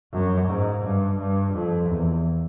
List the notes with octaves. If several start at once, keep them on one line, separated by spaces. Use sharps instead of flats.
F#2
G#2
G2
G2
F2
E2